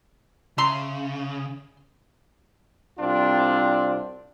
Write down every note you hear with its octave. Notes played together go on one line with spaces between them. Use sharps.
C#3 E5 A#5 C6
C2 C4 D4 F4